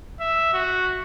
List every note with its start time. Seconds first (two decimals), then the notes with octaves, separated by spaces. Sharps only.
0.20 E5
0.53 F#4